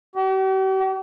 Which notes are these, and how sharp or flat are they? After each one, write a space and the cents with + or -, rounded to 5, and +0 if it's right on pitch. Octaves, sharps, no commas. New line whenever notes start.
G4 -45